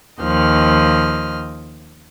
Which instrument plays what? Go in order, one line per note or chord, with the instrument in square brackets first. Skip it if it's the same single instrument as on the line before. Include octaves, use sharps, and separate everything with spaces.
[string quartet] D#2 F3 D#5 F6